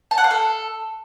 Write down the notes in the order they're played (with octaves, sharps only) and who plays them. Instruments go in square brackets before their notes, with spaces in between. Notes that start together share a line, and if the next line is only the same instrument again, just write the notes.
[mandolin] A5
F#5
F5
A4